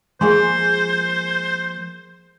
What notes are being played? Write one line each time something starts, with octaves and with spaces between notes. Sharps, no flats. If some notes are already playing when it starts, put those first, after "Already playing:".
F3 G#3 A#3 G#4 C5 G#5 C6